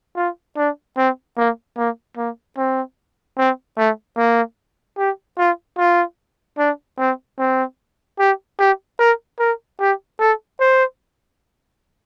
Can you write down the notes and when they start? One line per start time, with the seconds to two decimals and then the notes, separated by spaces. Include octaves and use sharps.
0.16 F4
0.57 D4
0.97 C4
1.37 A#3
1.77 A#3
2.17 A#3
2.57 C4
3.38 C4
3.78 A3
4.18 A#3
4.98 G4
5.39 F4
5.78 F4
6.58 D4
6.99 C4
7.39 C4
8.19 G4
8.59 G4
8.99 A#4
9.39 A#4
9.80 G4
10.20 A4
10.60 C5